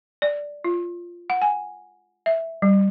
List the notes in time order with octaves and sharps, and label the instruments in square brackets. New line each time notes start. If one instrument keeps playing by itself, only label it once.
[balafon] D5
F4
F#5
G#5
E5
G3